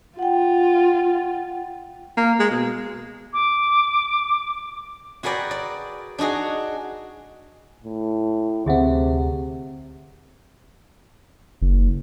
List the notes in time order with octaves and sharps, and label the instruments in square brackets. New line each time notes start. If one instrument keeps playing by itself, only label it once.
[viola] F4 [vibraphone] F#5 G5
[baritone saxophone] A#3
G#3
B2
[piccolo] D6
[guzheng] F#4 G#4 A#4 B4 D5 G5
D5
D4 D#4 F#4 G#4
[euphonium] A2
[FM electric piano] D2 C4 [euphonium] C3 [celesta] G#4 E5 F#5
[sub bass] F#1